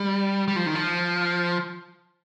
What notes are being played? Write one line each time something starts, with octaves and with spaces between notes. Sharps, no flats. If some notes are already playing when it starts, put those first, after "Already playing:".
Already playing: G3
G3
F3
D#3
F3